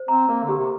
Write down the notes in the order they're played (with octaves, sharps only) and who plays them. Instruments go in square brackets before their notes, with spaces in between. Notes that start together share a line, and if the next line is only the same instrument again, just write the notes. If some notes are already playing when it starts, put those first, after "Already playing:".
Already playing: [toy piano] C5
[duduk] C4 [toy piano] A#5
[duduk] A#3 [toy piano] A#4
[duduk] D3
[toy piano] G4
[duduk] C3